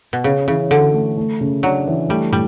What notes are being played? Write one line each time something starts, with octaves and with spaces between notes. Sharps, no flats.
B2
C#3 C#4
C#3 E3
D3 F#4
A3
A3
C#3
F#3 D4
E3
G3 A3
A2 G3